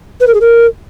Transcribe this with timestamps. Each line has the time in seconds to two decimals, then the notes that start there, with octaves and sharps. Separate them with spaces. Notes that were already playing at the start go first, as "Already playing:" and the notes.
0.20 B4
0.27 A#4
0.34 G#4
0.41 A#4